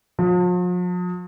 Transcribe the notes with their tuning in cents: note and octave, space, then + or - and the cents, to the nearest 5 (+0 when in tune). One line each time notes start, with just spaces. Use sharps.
F3 +45